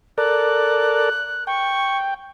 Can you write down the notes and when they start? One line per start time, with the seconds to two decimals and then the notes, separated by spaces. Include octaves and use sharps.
0.18 A4 A#4 D5 F#6
1.47 G5 C#6